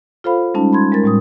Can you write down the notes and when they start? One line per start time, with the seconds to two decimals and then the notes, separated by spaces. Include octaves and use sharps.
0.24 F4 A4 C5 F5 B5
0.54 G3 G#3 C#4 D#4 A5
0.73 B5 C6 G#6
0.92 G#3 A#4 A6
1.04 A2 G3 D#6